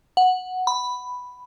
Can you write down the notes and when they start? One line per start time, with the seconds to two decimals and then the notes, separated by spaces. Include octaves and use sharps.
0.17 F#5
0.67 B5